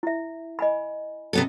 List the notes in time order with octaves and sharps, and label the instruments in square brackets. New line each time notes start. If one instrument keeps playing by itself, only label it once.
[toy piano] E4 E5
D#5 G#5 B5
[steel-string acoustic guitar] C3 B3 A4